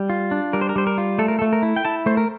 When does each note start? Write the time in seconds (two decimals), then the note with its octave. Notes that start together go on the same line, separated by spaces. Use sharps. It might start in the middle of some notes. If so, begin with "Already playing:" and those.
Already playing: G3
0.10 F4
0.31 D4
0.53 G3 A#4
0.61 C5
0.69 A#4
0.76 G3 C5
0.87 A#4
0.98 F4
1.18 A3 A4
1.28 A#4
1.39 A4
1.42 A3
1.53 A#4
1.62 E4
1.76 G5
1.85 E4 A5
2.06 A3 C5
2.17 A#4